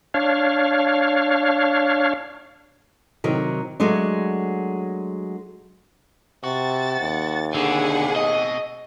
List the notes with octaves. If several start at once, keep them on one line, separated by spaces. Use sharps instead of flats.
D4 C#5 F5
C3 D#3 F#3
F#3 G#3 A3 D4
C3 F#4 A6
D#2
B2 D3 C4 G#4 F#5 G#5
D#5